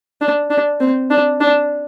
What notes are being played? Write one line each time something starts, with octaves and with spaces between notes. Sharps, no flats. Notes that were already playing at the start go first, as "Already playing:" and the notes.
D4
D4
C4
D4
D4